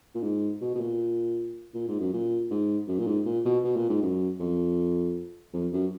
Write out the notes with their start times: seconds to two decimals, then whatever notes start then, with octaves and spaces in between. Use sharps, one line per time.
0.15 A#2
0.23 G#2
0.61 B2
0.75 B2
0.80 A#2
1.74 A#2
1.88 G#2
2.00 F#2
2.13 A#2
2.51 G#2
2.88 F#2
2.99 A#2
3.07 G#2
3.26 A#2
3.45 B2
3.64 B2
3.76 A#2
3.90 G#2
4.02 F#2
4.40 F2
5.53 F2
5.72 F#2